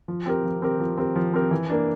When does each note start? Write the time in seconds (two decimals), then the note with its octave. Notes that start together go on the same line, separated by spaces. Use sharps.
0.08 F3
0.26 C4 G4 A#4
0.44 F3
0.62 C4 G4 A#4
0.80 F3
0.98 C4 G4 A#4
1.16 F3
1.34 C4 G4 A#4
1.51 E3
1.69 A#3 D4